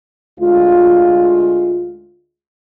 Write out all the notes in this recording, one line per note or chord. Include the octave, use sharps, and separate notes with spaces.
D2 G#3 F4